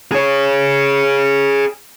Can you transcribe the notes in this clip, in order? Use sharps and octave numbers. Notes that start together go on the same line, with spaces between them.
G#4 C#5